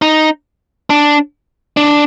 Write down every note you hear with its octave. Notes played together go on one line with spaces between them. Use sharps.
D#4
D4
D4